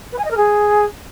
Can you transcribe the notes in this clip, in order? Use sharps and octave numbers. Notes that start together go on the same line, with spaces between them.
B4
G#5
D#5
A#4
G#4